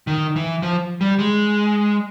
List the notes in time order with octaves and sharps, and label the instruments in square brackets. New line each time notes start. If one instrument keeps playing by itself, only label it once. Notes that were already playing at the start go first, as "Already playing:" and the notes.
[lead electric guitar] D#3
E3
F3
G3
G#3